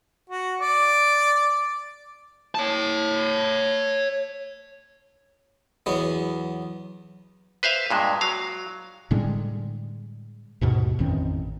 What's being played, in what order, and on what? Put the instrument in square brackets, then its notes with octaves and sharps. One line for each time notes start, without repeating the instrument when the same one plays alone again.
[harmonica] F#4
D5
[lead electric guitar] C#5 A5
[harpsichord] E2 F#3 B3
[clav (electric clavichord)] B4 C5 E5 F5
G2 A#2 G#3
F#3 F5
[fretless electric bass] A2 D3 G3 G#3
D#2 G#2 B2
A1 F2 D#3 C4